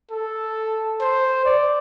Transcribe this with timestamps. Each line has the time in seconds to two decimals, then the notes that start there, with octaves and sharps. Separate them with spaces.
0.11 A4
1.01 C5
1.45 D5